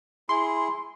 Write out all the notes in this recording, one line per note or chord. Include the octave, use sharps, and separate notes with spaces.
E4 G#4 C6